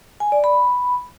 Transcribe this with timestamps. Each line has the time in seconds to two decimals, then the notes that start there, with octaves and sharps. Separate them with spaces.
0.20 G#5
0.32 D5
0.44 B5